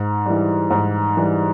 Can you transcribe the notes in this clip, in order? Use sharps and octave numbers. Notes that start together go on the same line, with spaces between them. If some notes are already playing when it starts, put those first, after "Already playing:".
Already playing: G#2
E3 G3
G#2
E3 G3